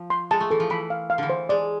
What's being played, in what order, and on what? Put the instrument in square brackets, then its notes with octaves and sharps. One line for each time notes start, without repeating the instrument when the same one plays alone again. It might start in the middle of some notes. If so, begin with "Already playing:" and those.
Already playing: [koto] F3
[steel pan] C6
[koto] G#3 [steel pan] A5
[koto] A3
[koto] E3 [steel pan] A4
[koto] F3
[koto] E3 [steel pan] B5
[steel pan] F5
F5
[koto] D3 E3
[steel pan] C5
[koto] G#3 [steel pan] D5